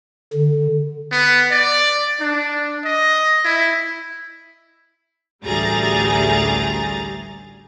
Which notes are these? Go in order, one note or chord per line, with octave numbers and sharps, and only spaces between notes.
D3
B3
D5
D4
D#5
E4
A1 D2 G3 G#4 A#5 A6